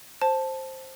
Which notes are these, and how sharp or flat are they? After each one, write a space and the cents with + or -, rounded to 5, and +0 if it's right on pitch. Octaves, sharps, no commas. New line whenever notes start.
C5 +10 A5 +0